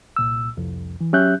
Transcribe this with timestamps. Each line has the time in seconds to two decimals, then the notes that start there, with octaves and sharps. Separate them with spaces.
0.16 C2 A#2 E6
0.57 C2 F2
1.01 E3
1.13 F#3 C#4 G4 E5 F#6 G6